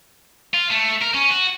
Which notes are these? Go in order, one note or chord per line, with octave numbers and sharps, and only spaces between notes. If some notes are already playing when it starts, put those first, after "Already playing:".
F4
A3
A#4
C#4
F#4